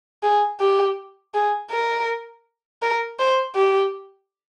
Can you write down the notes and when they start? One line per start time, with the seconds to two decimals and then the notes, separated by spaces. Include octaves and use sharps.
0.23 G#4
0.60 G4
1.34 G#4
1.71 A#4
2.82 A#4
3.19 C5
3.56 G4